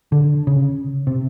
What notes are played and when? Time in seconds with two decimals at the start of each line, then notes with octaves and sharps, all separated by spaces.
0.12 D3
0.47 C#3
1.07 C3